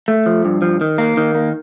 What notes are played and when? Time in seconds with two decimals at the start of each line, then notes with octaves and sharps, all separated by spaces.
0.08 A3
0.26 F3
0.45 G2
0.62 F3
0.81 D#3
0.98 A#3
1.17 D#3
1.35 A#3